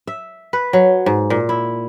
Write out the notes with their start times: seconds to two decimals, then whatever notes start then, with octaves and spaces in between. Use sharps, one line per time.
0.07 E5
0.53 B4
0.73 F#3
1.06 G#2
1.30 A#2
1.49 E4